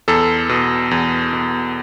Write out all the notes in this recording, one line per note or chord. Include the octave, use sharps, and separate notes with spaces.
E2 A4
B2
E2
B2